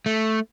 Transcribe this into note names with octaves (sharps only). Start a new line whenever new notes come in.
A3